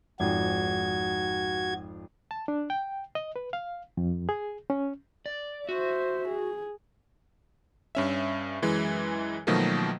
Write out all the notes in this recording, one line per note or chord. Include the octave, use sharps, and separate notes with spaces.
G#1 F2 G#2 F#4 G#6
A5
D4
G5
D#5
B4
F5
F2
G#4
C#4
D5
F#4 C5 E5
G#4
G2 C#4 E5
F#2 E3 G#3
B2 D#3 F3 F#3 A3 A#3